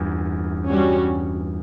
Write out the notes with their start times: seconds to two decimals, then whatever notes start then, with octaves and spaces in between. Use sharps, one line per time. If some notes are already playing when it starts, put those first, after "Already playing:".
Already playing: E2 G2
0.69 G3 C#4 F#4